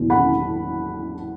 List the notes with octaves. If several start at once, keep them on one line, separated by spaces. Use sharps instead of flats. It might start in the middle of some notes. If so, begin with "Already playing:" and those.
Already playing: F#1 E2 B2
F#5 B5